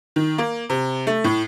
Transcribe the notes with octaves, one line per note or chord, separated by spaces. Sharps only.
D#3
A#3
C3
A3
A2